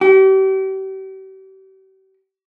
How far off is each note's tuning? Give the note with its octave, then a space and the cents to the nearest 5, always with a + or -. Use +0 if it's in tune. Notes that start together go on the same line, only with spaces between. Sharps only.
G4 -40